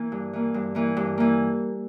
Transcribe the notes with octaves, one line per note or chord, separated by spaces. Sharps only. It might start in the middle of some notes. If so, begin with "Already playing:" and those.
Already playing: E3 A#3
G2
E3 A#3
G2
E3 A#3
G2
E3 A#3